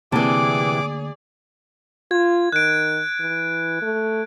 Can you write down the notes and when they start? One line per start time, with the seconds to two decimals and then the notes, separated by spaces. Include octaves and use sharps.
0.12 D2 C3 E3 A#3 G#4 D5 A5 D6
2.11 F4 G#6
2.52 D#3 F#6 D7
3.20 E3
3.82 A3